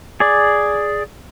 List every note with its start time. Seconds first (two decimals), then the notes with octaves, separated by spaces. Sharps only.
0.20 G#4 D5